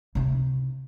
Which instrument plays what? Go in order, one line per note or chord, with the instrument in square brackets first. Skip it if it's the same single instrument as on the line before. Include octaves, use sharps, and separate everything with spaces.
[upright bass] C3 E4